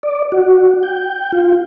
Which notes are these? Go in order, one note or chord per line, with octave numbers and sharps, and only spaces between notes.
D5
F#4
G5
F4